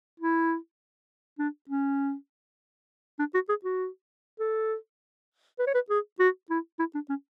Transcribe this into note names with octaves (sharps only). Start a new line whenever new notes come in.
E4
D4
C#4
D4
F#4
G#4
F#4
A4
B4
C#5
B4
G#4
F#4
E4
E4
D4
C#4